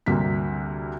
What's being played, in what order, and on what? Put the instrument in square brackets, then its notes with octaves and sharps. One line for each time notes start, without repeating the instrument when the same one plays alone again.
[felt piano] D2 C3 G3 A#3 B6